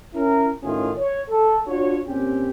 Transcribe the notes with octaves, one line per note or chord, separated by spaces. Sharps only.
C#4 E4 A#4
A2 D#3 C#4 E4 F4 G#4
C#5
A4
D4 F4 F#4 C#5
A#2 C4 C#4 G4